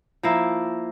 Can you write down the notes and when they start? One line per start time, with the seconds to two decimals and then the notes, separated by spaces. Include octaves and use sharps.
0.23 F3 A#3 E4